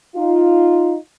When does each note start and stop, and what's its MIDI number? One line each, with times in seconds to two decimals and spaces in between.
0.16 0.95 63
0.16 0.95 65